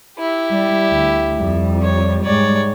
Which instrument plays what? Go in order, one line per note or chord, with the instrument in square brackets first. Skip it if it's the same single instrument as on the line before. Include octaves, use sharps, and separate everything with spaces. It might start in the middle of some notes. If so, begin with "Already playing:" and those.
[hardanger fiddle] E4 G4
[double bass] G3
D2
F2 G3
[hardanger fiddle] C#5
[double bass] G#2 G3 [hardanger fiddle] C#5 D5